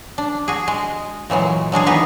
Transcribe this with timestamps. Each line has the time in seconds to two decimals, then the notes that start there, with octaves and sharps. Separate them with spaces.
0.18 D4
0.48 F#4 G#4
0.68 G#3
1.30 A#2 E3 F#3 G#3
1.72 F#3 G#3 D4 G#4
1.86 D#3 E3 B3 D#4 G#4 B4